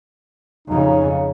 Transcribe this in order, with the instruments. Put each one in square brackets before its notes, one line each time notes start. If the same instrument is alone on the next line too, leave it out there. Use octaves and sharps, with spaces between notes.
[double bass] F2 C#3 [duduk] D#4